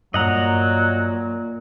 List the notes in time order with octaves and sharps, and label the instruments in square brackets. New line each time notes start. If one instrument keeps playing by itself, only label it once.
[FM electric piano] G2 [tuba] A#2 [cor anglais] F#3 [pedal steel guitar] D#5 F#5 A#5